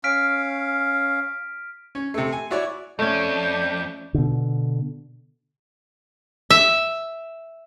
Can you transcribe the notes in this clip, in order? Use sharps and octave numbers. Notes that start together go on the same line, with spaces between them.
C#4 F5 F6 B6 D7
C#4
C3 A3
G#5
E4 F#4 C#5 D5
F2 A3 C#4 D5 G6
B2 D3
E5